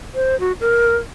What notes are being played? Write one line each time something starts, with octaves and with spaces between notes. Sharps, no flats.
C5
F#4
A#4